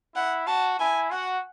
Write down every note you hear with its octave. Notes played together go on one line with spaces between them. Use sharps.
E4 F#5
F#4 A5
E4 G#5
F#4 F#5